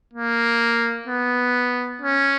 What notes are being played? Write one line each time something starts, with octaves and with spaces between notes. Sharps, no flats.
A#3
B3
C#4